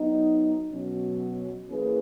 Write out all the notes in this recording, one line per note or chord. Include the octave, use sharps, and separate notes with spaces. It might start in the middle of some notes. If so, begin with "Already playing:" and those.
Already playing: F#3 B3 D#4 F#4
B2 F#3 C#4
E3 A#3 C#4 G#4 B4